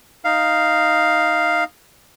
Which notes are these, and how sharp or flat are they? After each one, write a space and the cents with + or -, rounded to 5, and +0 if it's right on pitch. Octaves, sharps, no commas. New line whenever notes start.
D#4 +0 F5 +0